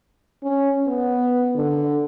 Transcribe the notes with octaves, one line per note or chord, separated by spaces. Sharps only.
C#4
B3
D3